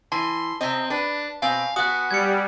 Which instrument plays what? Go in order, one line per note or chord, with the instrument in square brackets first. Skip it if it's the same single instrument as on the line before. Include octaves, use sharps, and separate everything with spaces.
[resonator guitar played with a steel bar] E3 [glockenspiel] A5 [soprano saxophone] C6
[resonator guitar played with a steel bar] C3 D#5 [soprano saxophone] C4
[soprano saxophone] D4 [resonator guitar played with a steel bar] B4
[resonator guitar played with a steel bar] B2 C4 [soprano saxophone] F5 [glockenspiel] G#5
[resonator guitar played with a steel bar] B3 F#5 [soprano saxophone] F#4 [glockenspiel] D#6 F#6
[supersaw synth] G3 [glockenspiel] G#6 C#7